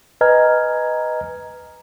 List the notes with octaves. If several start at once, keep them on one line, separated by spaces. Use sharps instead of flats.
B4 D#5 G#5 A#5 F6 G#6